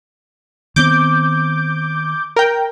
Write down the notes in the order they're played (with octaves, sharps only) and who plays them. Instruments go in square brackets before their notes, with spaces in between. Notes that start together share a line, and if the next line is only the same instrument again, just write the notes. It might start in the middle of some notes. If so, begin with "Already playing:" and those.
[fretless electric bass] D#3 B3 C4 [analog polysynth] D6 G6
[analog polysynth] A#4 G5